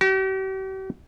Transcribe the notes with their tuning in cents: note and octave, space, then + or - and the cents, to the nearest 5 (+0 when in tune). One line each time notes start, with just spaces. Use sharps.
G4 -45